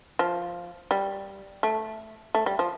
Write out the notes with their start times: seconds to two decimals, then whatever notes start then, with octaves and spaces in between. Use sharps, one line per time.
0.19 F3
0.91 G3
1.63 A3
2.35 A3
2.46 G3
2.59 F3